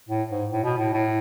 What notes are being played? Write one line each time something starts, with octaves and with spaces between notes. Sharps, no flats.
A2
G#2
A2
B2
A2
A2